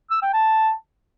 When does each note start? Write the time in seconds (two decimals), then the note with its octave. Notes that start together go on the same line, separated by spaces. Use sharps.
0.11 E6
0.22 G5
0.33 A5